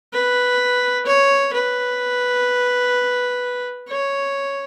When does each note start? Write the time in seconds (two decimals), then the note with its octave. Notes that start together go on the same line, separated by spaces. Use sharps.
0.13 B4
1.06 C#5
1.53 B4
3.88 C#5